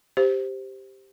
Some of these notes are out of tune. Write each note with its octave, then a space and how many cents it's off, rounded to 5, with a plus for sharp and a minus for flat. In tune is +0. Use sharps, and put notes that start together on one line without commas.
G4 +0 C5 +0